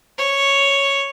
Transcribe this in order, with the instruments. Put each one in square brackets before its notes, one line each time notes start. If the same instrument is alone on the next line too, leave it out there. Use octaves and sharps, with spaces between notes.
[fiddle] C#5